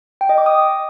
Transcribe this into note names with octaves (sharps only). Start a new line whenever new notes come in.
G5
D#5
D6
D#6